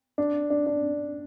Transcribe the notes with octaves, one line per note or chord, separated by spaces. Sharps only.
D4
D4
D4